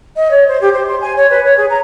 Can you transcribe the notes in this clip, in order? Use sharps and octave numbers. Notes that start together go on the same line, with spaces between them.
D#5
C#5
C5
G4
C5
C6
G#5
C#5
B4
C#5
G#4
A#5